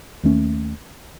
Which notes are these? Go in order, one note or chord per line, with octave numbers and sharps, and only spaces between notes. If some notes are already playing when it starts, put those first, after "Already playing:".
D#2 D#3 A3 C#4